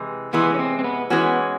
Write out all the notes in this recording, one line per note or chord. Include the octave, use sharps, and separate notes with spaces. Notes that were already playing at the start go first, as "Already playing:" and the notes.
Already playing: C3 E3 G#3
C3 E3 G#3 B3
C#4
C4
C4
B3
E3 G#3 B3 C#4 F#4